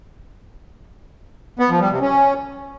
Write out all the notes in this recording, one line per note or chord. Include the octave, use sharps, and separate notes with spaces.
B3
F3
G3
C3
C#4